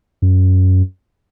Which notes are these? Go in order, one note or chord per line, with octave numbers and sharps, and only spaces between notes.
F#2